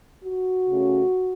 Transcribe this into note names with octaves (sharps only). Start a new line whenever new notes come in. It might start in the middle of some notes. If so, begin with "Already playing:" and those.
F#4
C#3 A3 C#4